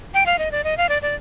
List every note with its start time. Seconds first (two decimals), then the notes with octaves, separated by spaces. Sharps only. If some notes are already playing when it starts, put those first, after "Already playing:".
0.14 G5
0.26 F5
0.39 D#5
0.52 D5
0.64 D#5
0.77 F5
0.89 D5
1.02 D5